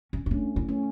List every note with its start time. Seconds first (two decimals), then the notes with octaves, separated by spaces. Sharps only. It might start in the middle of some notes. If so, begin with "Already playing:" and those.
0.13 C#4
0.26 E4
0.31 A3 C#4 D4
0.56 E4
0.69 A3 C#4